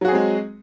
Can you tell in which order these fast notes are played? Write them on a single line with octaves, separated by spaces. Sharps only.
F#3 F#4 G#4 C4 G#3